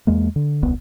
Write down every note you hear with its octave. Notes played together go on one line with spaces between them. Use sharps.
E2 G#3 A#3
D3
D#1 C2 B3